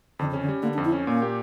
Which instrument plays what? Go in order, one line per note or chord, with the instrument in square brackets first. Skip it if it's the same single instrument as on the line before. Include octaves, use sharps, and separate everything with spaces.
[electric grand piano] F2 [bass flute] D3
[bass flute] C#3
[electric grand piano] C#4
[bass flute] D3
[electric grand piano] G3
[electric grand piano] D3 [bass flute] A#3
[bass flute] D4
[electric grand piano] F2
[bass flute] E4
[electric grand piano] C#4
[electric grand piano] A#2 [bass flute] A#3
[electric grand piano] G4